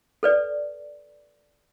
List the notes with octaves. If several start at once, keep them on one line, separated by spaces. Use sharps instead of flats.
A4 B4 D5